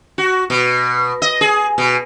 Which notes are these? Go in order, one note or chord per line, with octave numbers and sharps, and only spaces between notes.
F#4
B2
D#5
G#4
B2